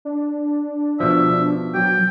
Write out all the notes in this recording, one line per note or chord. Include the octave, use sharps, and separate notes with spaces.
D4
B2 F3 E5
F#3 G5